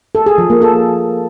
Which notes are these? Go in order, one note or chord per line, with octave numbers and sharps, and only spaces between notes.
A4
G#4
F3
A#3
A4